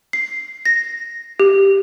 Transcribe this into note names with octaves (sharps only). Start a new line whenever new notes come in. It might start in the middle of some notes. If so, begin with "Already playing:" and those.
C7
A#6
G4